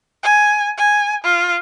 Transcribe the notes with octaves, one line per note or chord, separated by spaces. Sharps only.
G#5
G#5
F4